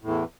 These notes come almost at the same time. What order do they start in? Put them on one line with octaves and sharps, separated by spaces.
A2 E2 E3